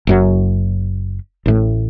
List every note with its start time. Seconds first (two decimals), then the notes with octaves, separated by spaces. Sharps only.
0.07 F#1 F#2 F#3
1.46 A1 A2 A3